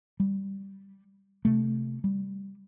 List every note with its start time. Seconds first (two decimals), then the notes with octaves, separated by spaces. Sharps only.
0.20 G3
1.45 C3 A3
2.04 G3